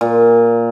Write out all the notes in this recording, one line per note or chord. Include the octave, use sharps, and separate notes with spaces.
A#2